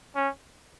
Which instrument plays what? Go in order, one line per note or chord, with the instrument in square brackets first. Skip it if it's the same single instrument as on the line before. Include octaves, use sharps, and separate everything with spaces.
[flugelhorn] C#4